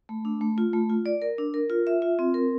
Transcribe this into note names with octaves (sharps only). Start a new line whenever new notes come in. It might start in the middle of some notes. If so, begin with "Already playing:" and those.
A3
D4
A3
F4
A3
F4
D5
A#4
D4
A#4
F4
E5
F4
C4
A#4